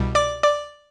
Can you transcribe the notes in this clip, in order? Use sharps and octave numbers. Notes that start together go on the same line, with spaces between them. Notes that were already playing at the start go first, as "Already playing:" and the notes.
Already playing: C2 B2 G3
D5 D6
D5 D6